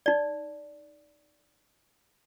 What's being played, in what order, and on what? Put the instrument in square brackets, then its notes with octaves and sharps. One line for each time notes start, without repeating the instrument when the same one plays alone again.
[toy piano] D#4 D5